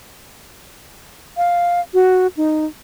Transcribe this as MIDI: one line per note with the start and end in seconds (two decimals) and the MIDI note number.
1.37 1.80 77
1.94 2.27 66
2.37 2.65 63